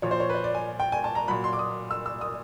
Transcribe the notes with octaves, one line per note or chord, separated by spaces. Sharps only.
A#2 F3 C#5
C5
C#5
B4
C5
D5
G#5
G5
G#5
A5
A#5
A#2 F#3 B5
C6
D6
D#6
E6
E6
D#6